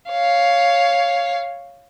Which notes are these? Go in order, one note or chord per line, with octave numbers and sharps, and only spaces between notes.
C#5 F5